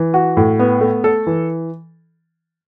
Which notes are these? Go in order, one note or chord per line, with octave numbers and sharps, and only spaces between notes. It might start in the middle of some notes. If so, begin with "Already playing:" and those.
Already playing: E3
F#4
A2
B3
A3
A4
E3